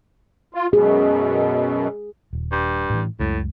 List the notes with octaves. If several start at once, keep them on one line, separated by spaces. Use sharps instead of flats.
F4
F#2 B2 G#4
D#1
G2
A2 E3
C#2 F#2 A2 G#3